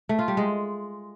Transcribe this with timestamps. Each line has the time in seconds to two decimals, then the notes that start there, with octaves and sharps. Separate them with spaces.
0.09 A3
0.19 F4
0.28 G3
0.37 G#3